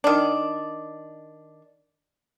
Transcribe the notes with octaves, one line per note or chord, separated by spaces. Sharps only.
D#3 D4